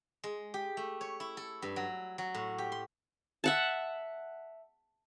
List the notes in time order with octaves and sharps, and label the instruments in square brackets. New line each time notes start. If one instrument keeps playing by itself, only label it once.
[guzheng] G#3
G4
A3
C#5
E4
A4
G2
F#3
F#3
A2
G4
C6
[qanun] E5 F#5 A5